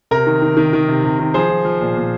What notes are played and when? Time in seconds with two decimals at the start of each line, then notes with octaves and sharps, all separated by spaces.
0.11 C3 A#4
0.27 D#3
0.42 D#3
0.57 D#3
0.73 D#3
0.88 C3
1.04 C3
1.19 D#3
1.34 F3 G#4 C5
1.50 F3
1.65 F3
1.81 A#2
1.96 A#2